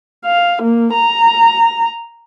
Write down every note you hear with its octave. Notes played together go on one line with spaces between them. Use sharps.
F5
A#3
A#5